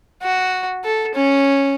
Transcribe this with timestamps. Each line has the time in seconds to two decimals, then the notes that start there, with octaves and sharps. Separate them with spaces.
0.23 F#4
0.84 A4
1.15 C#4